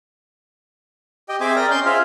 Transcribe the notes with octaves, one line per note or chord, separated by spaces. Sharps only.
G4 D#5 G5
C4 G#4 C5 E5 G#5 D6
A#4 D5 G5 A#5
C#4 D#5 C6 G6
F4 G#4 C5 E5 F5